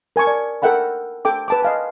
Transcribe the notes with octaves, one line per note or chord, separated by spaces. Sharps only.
A#4 G#5 A5 C#6
D5
A4 A#4 E5 F#5 G5 B5
A4 G5 D6
B4 A5 D6
D#5 F5 G#5